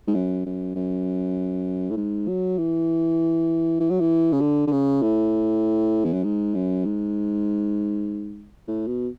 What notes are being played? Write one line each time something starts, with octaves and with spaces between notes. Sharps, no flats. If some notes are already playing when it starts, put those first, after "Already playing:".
G#2
F#2
F#2
F#2
A2
G#2
F#3
E3
E3
F#3
E3
C#3
D3
D3
C#3
A2
E2
F#2
G#2
F#2
G#2
A2
B2